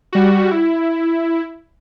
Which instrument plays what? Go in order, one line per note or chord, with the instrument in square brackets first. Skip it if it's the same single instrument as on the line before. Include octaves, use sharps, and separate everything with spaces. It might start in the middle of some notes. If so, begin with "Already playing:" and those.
[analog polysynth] G3 F#4
E4